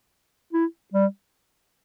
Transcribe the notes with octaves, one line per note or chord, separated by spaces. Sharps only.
E4
G3